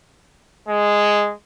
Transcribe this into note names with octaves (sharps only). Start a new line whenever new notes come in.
G#3